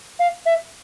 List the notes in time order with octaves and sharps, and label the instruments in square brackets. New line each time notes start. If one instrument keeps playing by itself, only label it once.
[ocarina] F5
E5